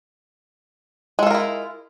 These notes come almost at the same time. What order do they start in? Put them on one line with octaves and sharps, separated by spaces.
G#3 A4 F4 A#4 E4